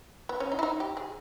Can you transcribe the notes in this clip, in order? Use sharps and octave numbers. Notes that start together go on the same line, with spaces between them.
B3
C#4
D#4
E4
D#4
G4
G#4